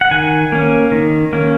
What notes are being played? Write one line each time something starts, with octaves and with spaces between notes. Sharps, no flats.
F#5
D#3 G#5
A#3 C#4
D#3
A#3 C#4